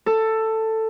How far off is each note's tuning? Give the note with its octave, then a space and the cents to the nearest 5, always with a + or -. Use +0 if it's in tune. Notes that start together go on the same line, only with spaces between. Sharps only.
A4 +10